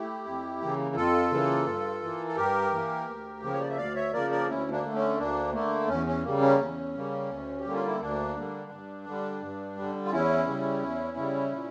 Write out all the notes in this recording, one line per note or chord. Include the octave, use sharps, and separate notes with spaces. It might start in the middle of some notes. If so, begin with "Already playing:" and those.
Already playing: A3 E4 G4
F2
C#3 E3 A#3
F2 F4 A4
C#3 E3 A#3
G2
E3 A#3
A4
G2 G4 A#4
E3 A#3
D2
C#3 F3 A#3 A#4
C#5
D5
E5
D2 D5 F5
C#5 E5
C#3 F3 A#3 A#4 D5
A#4 D5
D2 C#4 E4
A#3 D4
D3 A3
C#4
D2 A#3 D4
D3 A3 A#3
E2 C#4
C#4
C#3 G3 A#3
C#4
E2
C#3 G3 A#3
D2
G4
D3 G3 A#3
F4
E4
D2 A#3 D4
D3 G3 A#3
G2
D3 G3
G2
D3 G3
F4
E2 C#4 E4
C#3 G3
E2
C#3 G3
A#2